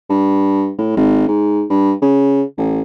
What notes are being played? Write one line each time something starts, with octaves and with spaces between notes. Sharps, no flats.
G2
A2
G#1
G#2
G2
C#3
A1